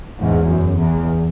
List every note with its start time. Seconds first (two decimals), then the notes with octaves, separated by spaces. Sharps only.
0.20 E2 G#2
0.48 F#2
0.78 E2